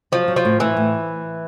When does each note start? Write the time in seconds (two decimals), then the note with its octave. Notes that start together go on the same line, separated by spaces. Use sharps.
0.12 F3 F#3
0.28 F#3
0.36 F3
0.45 A2
0.60 A2 E3
0.77 A2